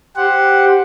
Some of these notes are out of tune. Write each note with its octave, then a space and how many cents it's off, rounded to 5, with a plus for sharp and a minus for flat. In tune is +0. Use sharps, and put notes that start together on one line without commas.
G4 +0 C5 +0 F#5 +0